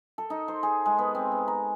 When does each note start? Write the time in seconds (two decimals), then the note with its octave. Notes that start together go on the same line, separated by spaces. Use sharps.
0.18 A4
0.30 D#4
0.48 C5
0.63 G#4
0.86 G#3
0.99 B3
1.15 C4
1.32 B3
1.48 A#5